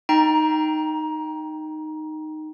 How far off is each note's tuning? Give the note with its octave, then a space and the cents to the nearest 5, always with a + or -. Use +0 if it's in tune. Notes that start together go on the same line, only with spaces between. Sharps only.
D#4 -5 G5 +0 A#5 +20